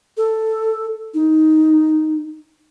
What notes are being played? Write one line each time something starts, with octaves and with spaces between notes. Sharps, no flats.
A4
D#4